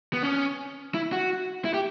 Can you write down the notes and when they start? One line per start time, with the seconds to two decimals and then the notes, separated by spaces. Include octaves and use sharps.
0.13 B3
0.23 C#4
0.94 E4
1.12 F#4
1.65 E4
1.74 G4